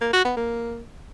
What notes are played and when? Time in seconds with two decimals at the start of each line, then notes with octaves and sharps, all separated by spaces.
0.01 A#3
0.13 F#4
0.25 B3
0.37 A#3